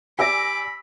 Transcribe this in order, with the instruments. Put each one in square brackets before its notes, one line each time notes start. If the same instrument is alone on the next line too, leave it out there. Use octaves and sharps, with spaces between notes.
[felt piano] G4 D5 A#6 [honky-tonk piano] G#5 E6 [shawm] B5 [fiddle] D6